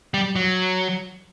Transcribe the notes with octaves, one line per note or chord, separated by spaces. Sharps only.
G3
F#3